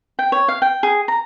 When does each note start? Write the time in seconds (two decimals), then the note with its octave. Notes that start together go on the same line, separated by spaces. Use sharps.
0.19 G5
0.32 C#5
0.48 F5
0.62 G5
0.83 G#4
1.08 A#5